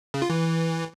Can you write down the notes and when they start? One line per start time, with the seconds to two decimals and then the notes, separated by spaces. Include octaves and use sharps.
0.14 C#3
0.22 F4
0.30 E3